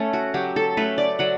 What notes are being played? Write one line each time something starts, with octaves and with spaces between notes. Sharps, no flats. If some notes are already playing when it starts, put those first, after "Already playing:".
Already playing: A3 C#4 A4
F#4
F#3 G4
A4
A3 C#4 B4
D5
F#3 F#5